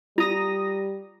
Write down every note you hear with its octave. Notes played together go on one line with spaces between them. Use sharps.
G3 F4 A#5 D#6 A#6